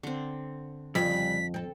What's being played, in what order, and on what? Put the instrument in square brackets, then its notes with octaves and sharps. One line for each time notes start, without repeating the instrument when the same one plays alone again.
[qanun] D3 C4
[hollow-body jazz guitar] F2 [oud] C#3 G3 [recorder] B6
[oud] C4 A4